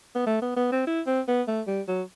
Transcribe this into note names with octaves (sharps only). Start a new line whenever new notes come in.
B3
A3
B3
B3
C4
E4
C4
B3
A3
G3
F#3